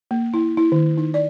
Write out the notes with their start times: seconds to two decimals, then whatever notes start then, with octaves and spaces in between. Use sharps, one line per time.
0.11 A#3
0.34 E4
0.57 E4
0.72 D#3
0.97 D#4
1.14 D5